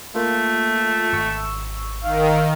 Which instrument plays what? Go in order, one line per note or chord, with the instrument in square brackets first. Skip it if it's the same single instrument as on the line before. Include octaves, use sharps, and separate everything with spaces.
[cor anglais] A3 [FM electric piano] A#3 F4
[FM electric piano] G#1 C#6 E6
[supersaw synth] D#3 [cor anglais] F5